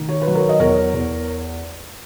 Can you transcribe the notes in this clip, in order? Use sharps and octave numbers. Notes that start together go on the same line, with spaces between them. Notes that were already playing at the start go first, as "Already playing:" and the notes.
Already playing: D#3
C#5
B4
F#3
A#4 C#5
D#5
E2 A#4 C#5
E2